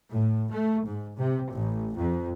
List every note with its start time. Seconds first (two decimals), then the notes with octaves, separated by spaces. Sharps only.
0.10 A2
0.52 A3
0.85 G#2
1.18 C3
1.51 A1
1.95 F2